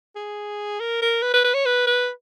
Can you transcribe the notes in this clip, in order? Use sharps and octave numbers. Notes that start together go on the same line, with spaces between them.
G#4
A#4
A#4
B4
B4
B4
C#5
B4
B4